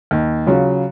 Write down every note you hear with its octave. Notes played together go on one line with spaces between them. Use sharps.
D#2
C#3 F#3 C#4 F4